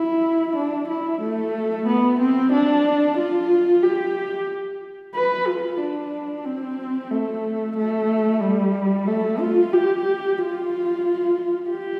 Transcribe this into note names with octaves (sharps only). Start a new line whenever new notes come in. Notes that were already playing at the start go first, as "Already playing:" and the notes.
Already playing: E4
D4
E4
A3
B3
C4
D4
F4
G4
B4
F4
D4
C4
A3
A3
G3
A3
F4
G4
F4
G4